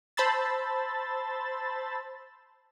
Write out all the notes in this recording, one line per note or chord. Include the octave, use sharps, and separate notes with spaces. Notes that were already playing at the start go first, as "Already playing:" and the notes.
C5 A5 B5 C6 E6 A6